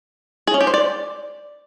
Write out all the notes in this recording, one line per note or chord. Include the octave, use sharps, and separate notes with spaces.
G#4
C#4
G4
C5
D5